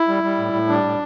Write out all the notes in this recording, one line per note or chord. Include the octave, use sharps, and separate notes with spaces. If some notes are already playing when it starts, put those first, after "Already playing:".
Already playing: E4
G3
G3
A2
A2
G3 D4
A2